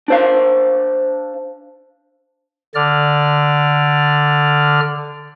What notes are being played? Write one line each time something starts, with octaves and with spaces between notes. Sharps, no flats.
D4 C5 F5
D3 D5 F6